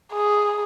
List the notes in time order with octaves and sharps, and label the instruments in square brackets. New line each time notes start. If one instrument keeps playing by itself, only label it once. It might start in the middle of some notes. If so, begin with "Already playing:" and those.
[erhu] G#4